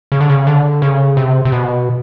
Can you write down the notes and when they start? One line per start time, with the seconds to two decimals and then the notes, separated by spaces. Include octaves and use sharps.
0.12 C#3
0.21 D3
0.29 C#3
0.47 D3
0.82 C#3
1.17 C3
1.45 C3
1.52 B2